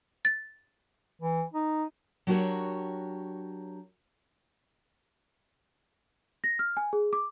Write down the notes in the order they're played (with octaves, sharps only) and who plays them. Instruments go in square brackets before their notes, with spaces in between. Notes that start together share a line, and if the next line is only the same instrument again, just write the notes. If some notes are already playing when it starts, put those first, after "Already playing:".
[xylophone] A6
[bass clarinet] E3
D#4
[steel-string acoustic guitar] F#3 D4 F#4 G4 A#4 C#5
[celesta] A#6
F6
G#5
G#4
D6